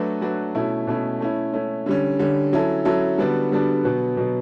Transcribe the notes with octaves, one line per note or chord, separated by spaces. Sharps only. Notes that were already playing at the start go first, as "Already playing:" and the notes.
Already playing: F#3 A3 D4 F#4 B4
F#3 A3 D4 F#4 B4
B2 A3 C#4 E4
B2 A3 C#4 E4
A3 C#4 E4
A3 C#4 E4
D3 G3 C#4
D3 G3 C#4
F#3 C#4 E4 A4
F#3 C#4 E4 A4
D3 G3 B3 D4 F#4
D3 G3 B3 D4 F#4
B2 F#3 B3
B2 F#3 B3